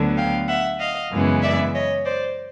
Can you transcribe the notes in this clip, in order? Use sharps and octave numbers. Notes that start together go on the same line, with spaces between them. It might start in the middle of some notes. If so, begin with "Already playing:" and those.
Already playing: D2 D3 F#3 B3
F5 G5
E5 F#5
D#5 F5
F#2 C#3 E3 G#3 B3
D5 E5
C#5 D#5
C5 D5